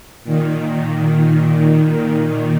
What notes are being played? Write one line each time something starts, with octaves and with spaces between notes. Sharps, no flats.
A#2 D#3